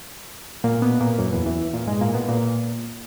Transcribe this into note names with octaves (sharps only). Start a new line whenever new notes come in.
A#2 A#3
B2 B3
A#2 A#3
F#2 F#3
E2 E3
E2 E3
A#2 A#3
G#2 G#3
A#2 A#3
B2 B3
A#2 A#3